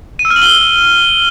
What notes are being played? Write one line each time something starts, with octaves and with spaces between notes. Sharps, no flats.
D#7
E6
F6
F#7
G7